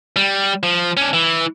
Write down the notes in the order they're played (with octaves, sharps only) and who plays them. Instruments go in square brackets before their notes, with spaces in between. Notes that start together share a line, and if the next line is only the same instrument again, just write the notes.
[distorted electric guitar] G3
F3
C#4 D4
E3